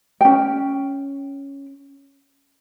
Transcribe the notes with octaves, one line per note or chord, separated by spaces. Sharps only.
C#4 G5